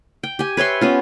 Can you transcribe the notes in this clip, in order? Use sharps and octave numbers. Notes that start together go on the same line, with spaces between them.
G5
G4 G#5
B4 C#5 E5 C6
B3 C#4 F4